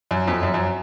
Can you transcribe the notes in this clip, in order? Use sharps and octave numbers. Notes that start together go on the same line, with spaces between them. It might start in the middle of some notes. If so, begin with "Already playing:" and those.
F#2
F2
F#2
F#2